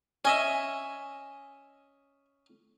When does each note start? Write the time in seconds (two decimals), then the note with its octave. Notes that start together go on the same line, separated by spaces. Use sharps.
0.25 C#4 D#5 E5 G#5